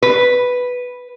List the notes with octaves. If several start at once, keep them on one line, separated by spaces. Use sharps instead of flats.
B4